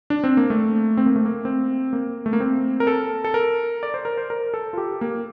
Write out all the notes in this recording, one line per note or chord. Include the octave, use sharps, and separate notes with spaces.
D4
C4
A#3
A3
C4
A#3
A3
A#3
C4
A#3
A3
A#3
C4
A#4
A4
A4
A#4
D5
C5
A#4
C5
A#4
A4
F4
G4
A#3